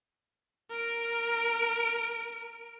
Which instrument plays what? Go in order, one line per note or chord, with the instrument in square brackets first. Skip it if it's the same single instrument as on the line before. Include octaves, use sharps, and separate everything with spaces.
[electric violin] A#4 D7